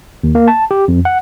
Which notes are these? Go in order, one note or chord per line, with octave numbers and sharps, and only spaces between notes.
D#2
A#3
A5
G4
F2
F#5